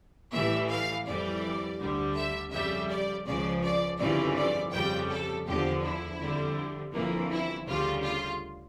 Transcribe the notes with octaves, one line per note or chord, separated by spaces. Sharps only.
A1 A2 E3 G3 E5
F5
F2 E3 G3 D5
D2 D3 G3
E5
F2 C#3 G3 E5
D5
C#2 C#3 F3 D5
D5
G1 F2 C#3 E3 G3 D5
D5
F2 C#3 G3 G5
A4
E2 D3 F3 G4
E4
F2 D3 G3
G1 F2 E3 A#3
E4
D2 C#3 G3 F4
F4